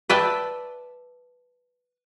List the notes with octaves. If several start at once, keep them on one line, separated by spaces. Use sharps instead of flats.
B4 D5 E5 G5 A5